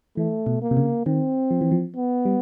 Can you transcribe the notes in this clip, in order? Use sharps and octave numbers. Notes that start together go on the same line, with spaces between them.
E3 A3
B2
A#3
C3
C#3
D#3 C4
F3
E3
F3
B3
G3